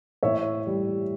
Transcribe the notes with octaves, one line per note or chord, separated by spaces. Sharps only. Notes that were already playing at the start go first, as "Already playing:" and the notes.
A2 C#5 E5
G3